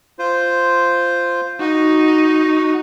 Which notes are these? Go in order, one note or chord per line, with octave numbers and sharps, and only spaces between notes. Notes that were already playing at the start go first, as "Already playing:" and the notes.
F4 C5
D#4 F#4